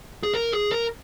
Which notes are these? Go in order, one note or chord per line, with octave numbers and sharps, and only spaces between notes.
G#4
A#4
G#4
A#4